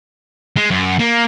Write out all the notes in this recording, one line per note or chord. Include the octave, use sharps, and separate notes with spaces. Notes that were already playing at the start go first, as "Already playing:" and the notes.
G#3
F#2
A#3